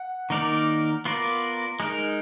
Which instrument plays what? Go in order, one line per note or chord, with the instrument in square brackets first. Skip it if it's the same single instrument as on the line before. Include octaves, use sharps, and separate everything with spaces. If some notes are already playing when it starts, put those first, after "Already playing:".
Already playing: [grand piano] F#5
[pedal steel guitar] D#3 A#3 D#4 A#4 D5
B3 F4 A#4 D5
G#3 D#4 A#4